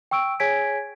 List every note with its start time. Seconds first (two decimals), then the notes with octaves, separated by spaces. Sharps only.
0.11 G5 C#6 E6 D7
0.40 G#4 C#5 G#5 G#6 B6 D7